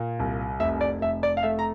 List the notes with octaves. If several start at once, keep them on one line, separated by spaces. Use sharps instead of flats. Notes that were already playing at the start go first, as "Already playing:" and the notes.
Already playing: A#2
C2
F1 E5
D5
F1 E5
D5
F5
A3 E5
A#5